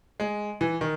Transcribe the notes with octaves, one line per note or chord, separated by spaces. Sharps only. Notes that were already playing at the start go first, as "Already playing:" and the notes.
G#3
E3
D#3